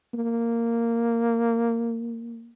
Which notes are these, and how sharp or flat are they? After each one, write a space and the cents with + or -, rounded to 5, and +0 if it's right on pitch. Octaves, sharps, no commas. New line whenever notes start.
A#3 -10